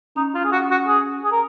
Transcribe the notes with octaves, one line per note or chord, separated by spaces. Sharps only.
C#4 D#4
F4
G#4
F#4
F#4
G#4
G#4
A#4